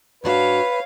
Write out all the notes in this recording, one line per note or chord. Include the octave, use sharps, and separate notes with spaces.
G#2 D4 F#4 B4 C#5 F5